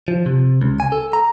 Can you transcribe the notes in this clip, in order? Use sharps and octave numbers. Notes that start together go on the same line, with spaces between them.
F3
C3
C#2
G#5
A4
A#5